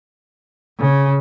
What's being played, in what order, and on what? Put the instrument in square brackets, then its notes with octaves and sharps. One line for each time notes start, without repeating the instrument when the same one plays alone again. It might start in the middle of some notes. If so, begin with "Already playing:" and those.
[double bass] C#3